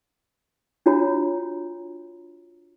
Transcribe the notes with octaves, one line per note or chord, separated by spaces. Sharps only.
D4 F4 F#4 C#5 A#5